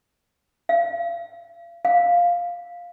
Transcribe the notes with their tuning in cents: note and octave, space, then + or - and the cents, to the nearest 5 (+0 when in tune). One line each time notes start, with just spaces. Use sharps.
F5 -40
F5 +5